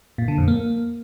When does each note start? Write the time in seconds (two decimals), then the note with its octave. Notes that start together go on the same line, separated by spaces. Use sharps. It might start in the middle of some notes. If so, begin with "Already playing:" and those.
0.18 A#2
0.28 D3
0.38 F2
0.48 A#3